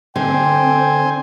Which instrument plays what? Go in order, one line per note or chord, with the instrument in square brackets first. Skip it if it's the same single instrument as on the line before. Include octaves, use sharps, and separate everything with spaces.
[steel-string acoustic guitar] D3 [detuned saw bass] C4 [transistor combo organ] C5 G#5 [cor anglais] G5